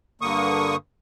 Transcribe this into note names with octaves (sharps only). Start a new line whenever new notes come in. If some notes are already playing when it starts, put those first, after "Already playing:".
G2 D3 A#3 C#6 D#6